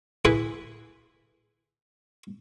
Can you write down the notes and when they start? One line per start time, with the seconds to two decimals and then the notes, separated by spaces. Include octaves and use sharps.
0.25 E3 E4 G#4 B4